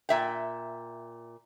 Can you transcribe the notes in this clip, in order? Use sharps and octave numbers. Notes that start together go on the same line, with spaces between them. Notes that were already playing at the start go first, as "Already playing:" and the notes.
A#2 E5 G5